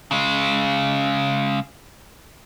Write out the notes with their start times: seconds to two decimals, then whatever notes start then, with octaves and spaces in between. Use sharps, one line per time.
0.11 C#3 G#3